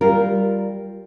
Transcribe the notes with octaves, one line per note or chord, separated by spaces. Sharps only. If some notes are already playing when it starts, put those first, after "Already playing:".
G3 F4 A#4